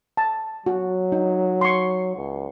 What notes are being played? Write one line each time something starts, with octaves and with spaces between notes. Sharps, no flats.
A5
F#3 F#4
D#4
C6 C#6
C#2